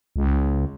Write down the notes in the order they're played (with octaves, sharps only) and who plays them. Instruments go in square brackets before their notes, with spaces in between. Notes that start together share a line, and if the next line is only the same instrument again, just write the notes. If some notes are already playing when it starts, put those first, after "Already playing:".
[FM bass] C#2